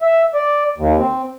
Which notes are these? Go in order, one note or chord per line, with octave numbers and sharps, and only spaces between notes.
E5
D5
D#2
C4